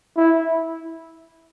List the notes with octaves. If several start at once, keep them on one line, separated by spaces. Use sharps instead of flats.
E4